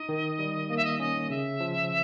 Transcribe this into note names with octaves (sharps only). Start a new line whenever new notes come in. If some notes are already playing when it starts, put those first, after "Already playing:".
Already playing: D#4 D#5
D#3
G3
A#3 D#5
E5
D#5
C#4 D#5
C#3 E5
F3